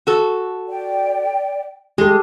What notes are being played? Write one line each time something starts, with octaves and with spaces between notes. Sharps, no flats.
F#4 A4
D5 G5
G#3 G4 A4